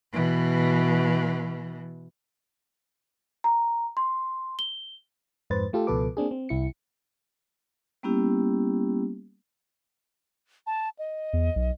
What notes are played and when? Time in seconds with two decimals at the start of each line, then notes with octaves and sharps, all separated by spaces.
0.12 B2 E3
3.44 A#5
3.97 C6
4.59 G7
5.50 F2 G#2 B4 C5 A6
5.73 A3 F4 G4 A4
5.87 C#2 B2 F3 A4 B4 D6
6.17 A#3 C4 D4 G#4
6.31 C4
6.49 C2 E4 C#7
8.03 G3 A#3 B3 C#4 E4 G4
10.67 A5
10.99 D#5
11.33 E2
11.56 B1